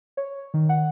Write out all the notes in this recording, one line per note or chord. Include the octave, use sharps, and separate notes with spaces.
C#5
D#3
F#5